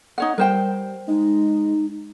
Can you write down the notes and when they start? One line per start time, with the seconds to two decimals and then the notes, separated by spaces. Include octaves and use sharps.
0.18 D#4 C#5 F#5
0.38 G3 A#4 C5 G5
1.08 G#3 D#4